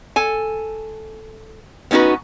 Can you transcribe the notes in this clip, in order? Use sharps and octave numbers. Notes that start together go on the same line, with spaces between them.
A4 G#5
B3 C#4 D#4 F#4 B4